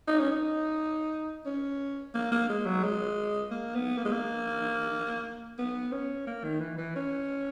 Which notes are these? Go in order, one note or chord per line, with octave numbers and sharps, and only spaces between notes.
D#4
C#4
D#4
C#4
A#3
A#3
G#3
F#3
G#3
A#3
B3
A#3
G#3
A#3
B3
C#4
A#3
D#3
E3
E3
C#4